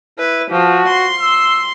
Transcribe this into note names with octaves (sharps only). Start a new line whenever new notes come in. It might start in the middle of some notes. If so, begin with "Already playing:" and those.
E4 B4
F3 F#4
C6
E6